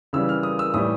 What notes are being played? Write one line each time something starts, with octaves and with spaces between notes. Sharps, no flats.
C#3 E3 G3 E6
F6
D#6
E6
A2 E3 G3 D#6